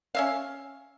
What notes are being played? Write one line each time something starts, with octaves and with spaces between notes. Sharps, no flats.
C#4 E5 F5